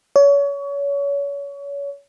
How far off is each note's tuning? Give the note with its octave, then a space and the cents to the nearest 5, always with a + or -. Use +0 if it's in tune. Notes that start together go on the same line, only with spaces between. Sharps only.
C#5 +30